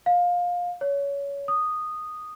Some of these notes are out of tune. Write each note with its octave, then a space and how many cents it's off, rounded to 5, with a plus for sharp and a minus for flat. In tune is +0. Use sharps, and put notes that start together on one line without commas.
F5 +20
C#5 +20
D#6 -10